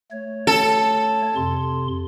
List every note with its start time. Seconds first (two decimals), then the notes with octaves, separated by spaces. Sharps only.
0.11 A3 C#5
0.47 A4
1.36 F2 C3 C6